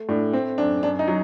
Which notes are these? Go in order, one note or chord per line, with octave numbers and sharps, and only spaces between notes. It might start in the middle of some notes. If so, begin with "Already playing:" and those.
Already playing: A3
A2 D4
A3 C4
F#2 D4
F#2 D4
D#4
F#3